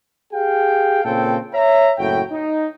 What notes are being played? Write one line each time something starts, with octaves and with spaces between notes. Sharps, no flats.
G4 G#4 F5 G5
A#2 C#3 C4 A4 G5
C#5 E5 A#5
F#1 A2 F#4 G5
D#4